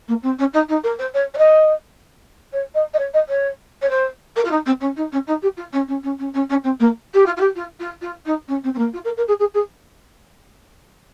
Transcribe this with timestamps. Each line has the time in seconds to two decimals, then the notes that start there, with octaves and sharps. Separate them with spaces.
0.08 A#3
0.23 C4
0.39 C#4
0.53 D#4
0.69 D#4
0.84 A#4
0.99 C5
1.14 C#5
1.34 C#5
1.38 D#5
2.53 C#5
2.74 D#5
2.94 D#5
2.99 C#5
3.14 D#5
3.29 C#5
3.82 C#5
3.90 C5
4.36 A#4
4.45 F4
4.51 D#4
4.66 C4
4.81 C#4
4.96 D#4
5.12 C#4
5.27 D#4
5.42 G4
5.57 F4
5.73 C#4
5.88 C#4
6.03 C#4
6.19 C#4
6.34 C#4
6.50 C#4
6.64 C4
6.80 A#3
7.14 G4
7.26 F4
7.37 F4
7.40 G4
7.56 F4
7.80 F4
8.01 F4
8.25 D#4
8.48 C#4
8.64 C4
8.74 C4
8.78 A#3
8.93 F4
9.04 A#4
9.17 A#4
9.28 G#4
9.39 G#4
9.54 G#4